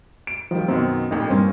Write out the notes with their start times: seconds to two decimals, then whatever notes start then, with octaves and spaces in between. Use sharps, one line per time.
0.27 D7
0.51 D#3 F3 G3
0.68 F#2 B2 D#3 C4
1.11 A1 F2 A#2 D#4
1.30 G2 A#3 C4 C#4 C5